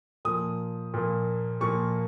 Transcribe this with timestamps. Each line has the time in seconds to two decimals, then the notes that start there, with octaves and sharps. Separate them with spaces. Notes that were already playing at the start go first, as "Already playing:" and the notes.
0.25 A#2 F3 A#3 D#6
0.94 A#2 F3 A#3
1.61 A#2 F3 A#3 C#6